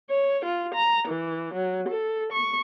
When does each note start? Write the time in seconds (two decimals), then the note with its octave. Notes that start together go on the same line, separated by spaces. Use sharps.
0.10 C#5
0.45 F4
0.75 A#5
1.08 E3
1.54 F#3
1.89 A4
2.33 C#6